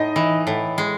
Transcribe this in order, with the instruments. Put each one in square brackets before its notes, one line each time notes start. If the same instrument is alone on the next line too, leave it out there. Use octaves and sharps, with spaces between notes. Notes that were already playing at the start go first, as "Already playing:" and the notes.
Already playing: [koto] A2 [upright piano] D#4 D#5
[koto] E3
A2
G#3